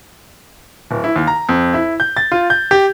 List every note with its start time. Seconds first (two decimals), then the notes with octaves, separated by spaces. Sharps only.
0.91 D1
1.04 E4
1.16 D#2
1.27 A#5
1.49 F2
1.74 E4
2.00 G6
2.17 A6
2.32 F4
2.50 G6
2.71 G4